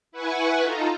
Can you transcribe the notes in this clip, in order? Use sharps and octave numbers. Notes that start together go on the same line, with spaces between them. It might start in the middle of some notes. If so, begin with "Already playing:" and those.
E4 B4 F#5 G#5 C#6
D#4 F4 A4 A#5